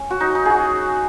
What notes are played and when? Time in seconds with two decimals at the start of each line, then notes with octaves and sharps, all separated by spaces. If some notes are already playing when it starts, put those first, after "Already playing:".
Already playing: C#4
0.10 F#4
0.20 D#4
0.35 D#4
0.45 F#4 G#4